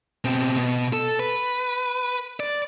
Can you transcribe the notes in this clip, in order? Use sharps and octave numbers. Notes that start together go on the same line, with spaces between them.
B2 C4
B2
A4
B4
D5